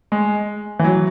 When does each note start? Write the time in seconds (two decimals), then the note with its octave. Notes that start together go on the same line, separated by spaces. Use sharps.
0.12 G#3
0.79 E3
0.84 F#3